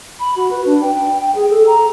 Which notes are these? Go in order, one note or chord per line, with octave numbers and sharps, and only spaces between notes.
B5
F#4
B4
D4
G5
G5
G#4
A4
A#5